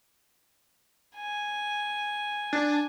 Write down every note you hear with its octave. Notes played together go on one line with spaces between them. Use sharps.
G#5
D4